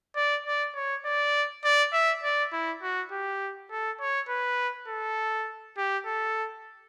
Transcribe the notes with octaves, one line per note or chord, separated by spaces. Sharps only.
D5
D5
C#5
D5
D5
E5
D5
E4
F#4
G4
A4
C#5
B4
A4
G4
A4